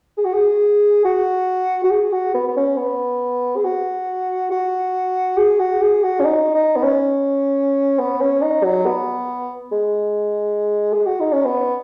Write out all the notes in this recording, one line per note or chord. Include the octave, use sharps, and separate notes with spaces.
G#4
F#4
G#4
F#4
F#4
G#4
F#4
B3
B3
C#4
B3
G#4
F#4
F#4
G#4
F#4
G#4
F#4
C#4
D#4
D#4
B3
C#4
B3
C#4
D#4
F#3
B3
G#3
G#4
F#4
D#4
C#4
B3